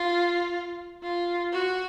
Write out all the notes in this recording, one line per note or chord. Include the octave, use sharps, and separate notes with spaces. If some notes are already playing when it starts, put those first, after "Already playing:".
Already playing: F4
F4
F#4